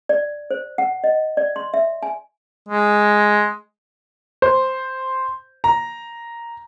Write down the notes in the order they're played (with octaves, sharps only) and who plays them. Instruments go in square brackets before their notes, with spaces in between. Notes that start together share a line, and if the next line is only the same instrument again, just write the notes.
[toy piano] D5
C5
F#5
D#5
D5
C6
E5
G#5
[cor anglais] G#3
[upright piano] C5
A#5